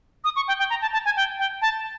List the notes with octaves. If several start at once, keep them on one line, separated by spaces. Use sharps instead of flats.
D#6
C#6
G5
G5
A#5
A5
A5
G#5
G5
G5
A5